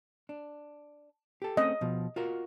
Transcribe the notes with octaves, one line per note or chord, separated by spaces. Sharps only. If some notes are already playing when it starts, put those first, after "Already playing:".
D4
G4 A4
A3 C4 C#4 D#5
B2 F3
F4 F#4 A#4